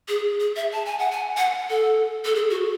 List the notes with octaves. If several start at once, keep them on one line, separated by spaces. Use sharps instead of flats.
G#4
G#4
E5
A5
G#5
F#5
G#5
F#5
A4
A4
G#4
F#4